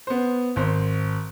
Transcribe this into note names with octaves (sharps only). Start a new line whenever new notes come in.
B3 C5
G#1 C5